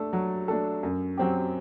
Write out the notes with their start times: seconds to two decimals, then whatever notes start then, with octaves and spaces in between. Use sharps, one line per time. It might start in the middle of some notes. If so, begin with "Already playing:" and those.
Already playing: A3 D4 A4
0.13 F#3
0.48 A3 D4 A4
0.83 F#2
1.18 F#3 C4 G4